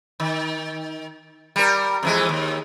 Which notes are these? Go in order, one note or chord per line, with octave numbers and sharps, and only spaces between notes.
D#3
G3 A#4
F2 E3 G#3
D#2